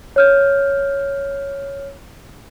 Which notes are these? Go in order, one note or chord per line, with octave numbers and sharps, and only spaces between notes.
C#5 F6 G6